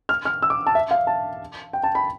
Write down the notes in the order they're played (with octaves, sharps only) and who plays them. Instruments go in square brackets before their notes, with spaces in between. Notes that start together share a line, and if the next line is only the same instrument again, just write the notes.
[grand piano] F6
F6
E6
D6
A5
E5
F5
A5
G5
A5
B5